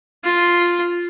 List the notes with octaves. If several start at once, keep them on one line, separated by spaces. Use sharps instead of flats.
F4